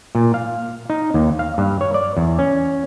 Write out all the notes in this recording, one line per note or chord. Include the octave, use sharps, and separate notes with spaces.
A#2
F5
D#4
D#2
F5
G2
C#5
D5
E2
C#4